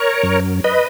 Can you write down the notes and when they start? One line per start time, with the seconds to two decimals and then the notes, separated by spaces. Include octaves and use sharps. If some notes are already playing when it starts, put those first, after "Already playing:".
Already playing: A#4 C#5
0.23 F#2
0.64 B4 D#5